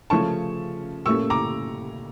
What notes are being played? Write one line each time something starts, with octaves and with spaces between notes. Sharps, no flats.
C#3 F3 A3 C#4 A5 C#6
A#2 A3 C#4 C#6 E6
A#5 D6